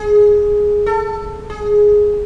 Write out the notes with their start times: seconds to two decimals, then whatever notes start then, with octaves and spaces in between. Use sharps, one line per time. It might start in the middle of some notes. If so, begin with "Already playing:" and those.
Already playing: G#4
0.86 A4
1.50 G#4